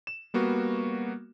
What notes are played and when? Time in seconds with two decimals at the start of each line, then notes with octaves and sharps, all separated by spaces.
0.07 E7
0.34 G3 A#3 B3 F#4